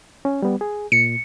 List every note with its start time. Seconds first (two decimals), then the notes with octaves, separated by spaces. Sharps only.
0.25 C#4
0.42 G3 B3
0.61 G#4
0.92 A#2 C#7